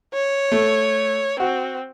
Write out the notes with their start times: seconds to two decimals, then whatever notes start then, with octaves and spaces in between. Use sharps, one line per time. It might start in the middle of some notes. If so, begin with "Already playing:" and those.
0.15 C#5
0.52 A3
1.40 C4 F#4